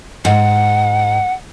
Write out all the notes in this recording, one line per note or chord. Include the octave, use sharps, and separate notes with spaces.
G#2 F#5